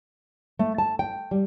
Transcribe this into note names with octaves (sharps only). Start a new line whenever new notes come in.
A3
A5
G5
G3